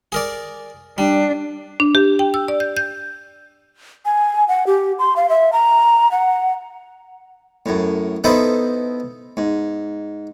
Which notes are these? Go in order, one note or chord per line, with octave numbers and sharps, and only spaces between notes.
G#4 A#4 D5
G3 D4
D4
G4
G5
E6
D5
G6
G6
G#5
F#5
G4
C6
F5
E5
A#5
F#5
F#2 A2
B3 D#4 E4 A4 B4 C5
G#2